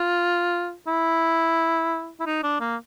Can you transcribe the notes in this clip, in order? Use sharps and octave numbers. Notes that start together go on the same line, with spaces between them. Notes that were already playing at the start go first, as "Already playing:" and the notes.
Already playing: F4
E4
E4
D#4
D4
A#3